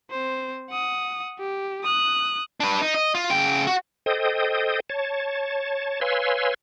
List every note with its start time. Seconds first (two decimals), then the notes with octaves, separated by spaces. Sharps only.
0.10 C4 C5
0.71 F#5 D#6
1.39 G4
1.83 D#6 F#6
2.60 D4 B4
2.82 D#4
2.94 D#5
3.15 F4
3.30 C#3 G5
3.67 F#4
4.06 A4 C5 D#5 G5 D#6
4.90 C#5 A5
6.01 B4 C#5 F5 G#5 C6 E6